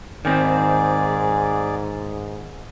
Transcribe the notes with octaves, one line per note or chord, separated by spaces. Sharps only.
G#2 D#3 C4 G#4 D5